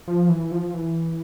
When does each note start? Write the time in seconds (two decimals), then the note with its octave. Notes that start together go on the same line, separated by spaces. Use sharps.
0.08 F3
0.29 E3
0.51 F3
0.74 E3